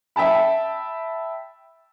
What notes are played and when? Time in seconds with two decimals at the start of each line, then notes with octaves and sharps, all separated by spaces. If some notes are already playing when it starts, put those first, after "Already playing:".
0.16 E5 G5 A5 B5